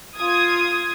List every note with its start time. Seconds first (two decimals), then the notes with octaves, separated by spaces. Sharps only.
0.16 F4 D#6 G#6